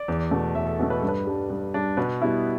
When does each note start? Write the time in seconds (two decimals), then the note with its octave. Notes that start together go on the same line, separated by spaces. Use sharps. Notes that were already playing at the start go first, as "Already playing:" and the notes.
Already playing: D5
0.08 E2
0.31 B2 A3
0.55 E2 E5
0.67 A4
0.80 B2 A3 A4
0.90 B4
1.00 G2 A4
1.08 B4
1.27 G3 D4
1.50 G2
1.74 G3 D4
1.97 B2 B4
2.22 G3 B3 E4